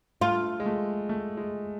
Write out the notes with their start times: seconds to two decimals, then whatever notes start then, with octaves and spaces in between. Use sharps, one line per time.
0.21 A3 F4
0.60 G#3
0.66 A3
1.09 A3
1.37 G#3